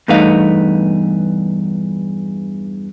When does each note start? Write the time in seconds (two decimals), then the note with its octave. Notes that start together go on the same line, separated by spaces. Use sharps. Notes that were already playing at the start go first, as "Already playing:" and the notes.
0.08 E2 G2 A3 B3 D#4 F5